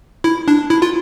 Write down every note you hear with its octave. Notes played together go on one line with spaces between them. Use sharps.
E4
D4
E4
F4